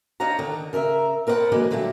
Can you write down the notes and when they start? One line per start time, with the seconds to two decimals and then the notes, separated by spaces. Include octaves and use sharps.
0.20 D4 D#4 C#5 F5 F#5 A#5
0.39 D3 D#3
0.73 C#3 A#4 C#5 E5
1.27 C4 A#4 B4 C#5 F#5 A5
1.52 D3 E3 F#3 G#3 A#3
1.71 A#2 D3 F#3 G3 A3